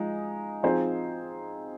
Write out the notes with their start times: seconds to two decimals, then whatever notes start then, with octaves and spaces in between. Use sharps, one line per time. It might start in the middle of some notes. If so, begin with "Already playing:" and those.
Already playing: F3 G#3 D#4
0.63 F3 C4 D#4 G#4 C5